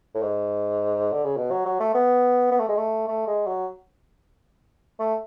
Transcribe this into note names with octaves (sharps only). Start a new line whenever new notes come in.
A2
G#2
D3
C#3
B2
F#3
F#3
A3
B3
B3
A3
G#3
A3
A3
G#3
F#3
A3